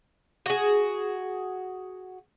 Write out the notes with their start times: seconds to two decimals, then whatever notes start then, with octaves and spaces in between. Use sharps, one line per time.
0.46 F#4 G#4